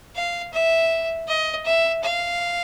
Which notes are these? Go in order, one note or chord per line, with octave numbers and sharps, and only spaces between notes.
F5
E5
D#5
E5
F5